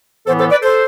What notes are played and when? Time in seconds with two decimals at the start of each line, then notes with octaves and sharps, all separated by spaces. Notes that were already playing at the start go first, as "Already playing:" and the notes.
0.26 A2 E3 B3 A4 C5
0.38 A4 C5
0.50 B4 D5
0.62 A4 C5